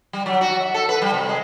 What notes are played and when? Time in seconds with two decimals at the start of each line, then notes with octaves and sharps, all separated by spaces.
0.13 G3
0.26 F#3
0.41 F#4
0.60 E5
0.74 A4
0.89 B4
1.02 G3
1.14 C3
1.29 G#3